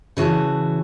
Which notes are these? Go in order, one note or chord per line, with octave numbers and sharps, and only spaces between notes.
C#3 E3 F#4 A5